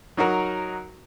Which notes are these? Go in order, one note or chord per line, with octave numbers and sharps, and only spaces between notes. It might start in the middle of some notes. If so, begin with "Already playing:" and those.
F#3 D#4 F#4 A#4